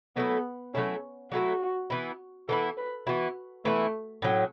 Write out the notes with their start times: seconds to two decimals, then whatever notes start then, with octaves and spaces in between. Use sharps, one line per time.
0.16 F#3 A3 B3 E4 A4
0.73 F#3 A3 C#4 E4 A4
1.32 F#3 A3 E4 F#4 A4
1.90 E3 B3 E4
2.48 E3 B3 E4 A4
2.77 B4
3.07 E3 B3 E4 F#4
3.65 E3 A3 B3 E4
4.22 A2 F#3 C#4